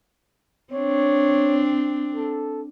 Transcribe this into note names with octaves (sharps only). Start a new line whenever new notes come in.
C4 D4 C#5
A4